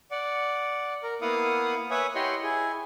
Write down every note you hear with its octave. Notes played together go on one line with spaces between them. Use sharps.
D5 F#5
A#4
A#3 B3 E4 F5 F#5 D#6
B4 C#5 E5 G#5 D#6
E4 G4 C#5 D#5 F#5 C6
E4 G#4